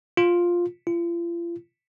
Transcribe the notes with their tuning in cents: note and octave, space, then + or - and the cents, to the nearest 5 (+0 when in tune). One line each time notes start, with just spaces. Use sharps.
F4 +5
F4 -40